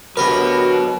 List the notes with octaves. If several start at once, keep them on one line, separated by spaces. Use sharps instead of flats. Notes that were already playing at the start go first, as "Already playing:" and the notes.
D2 B2 F#3 G4 A#4 B4